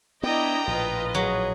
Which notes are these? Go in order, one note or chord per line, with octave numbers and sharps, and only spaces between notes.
B3 D4 E4 D#5 G5 A#5
A#1 A2 F4 B4 D#5
F#3 G#4